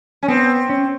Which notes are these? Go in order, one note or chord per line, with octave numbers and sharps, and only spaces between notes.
C#4
B3 C4
C#4